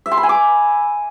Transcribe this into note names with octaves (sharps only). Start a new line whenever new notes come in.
E5
C6
B5
G#5
D6